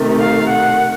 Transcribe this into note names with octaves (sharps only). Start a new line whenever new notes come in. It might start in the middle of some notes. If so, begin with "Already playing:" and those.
Already playing: C3 D#3 A3
F5
F#5